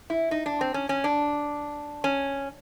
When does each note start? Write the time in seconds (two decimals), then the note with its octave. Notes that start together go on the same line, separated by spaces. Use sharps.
0.10 E4
0.31 D#4
0.46 D4
0.61 C4
0.74 C#4
0.89 C#4
1.04 D4
2.04 C#4